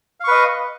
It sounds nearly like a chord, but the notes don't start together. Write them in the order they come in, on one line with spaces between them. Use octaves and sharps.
F5 C#6 B4 D#5